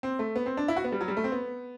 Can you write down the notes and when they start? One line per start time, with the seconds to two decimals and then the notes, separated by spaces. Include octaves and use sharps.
0.03 C4
0.19 A3
0.36 B3
0.46 C4
0.57 D4
0.68 E4
0.76 F#4
0.84 B3
0.92 G3
1.01 F#3
1.08 G3
1.17 A3
1.24 C4
1.32 B3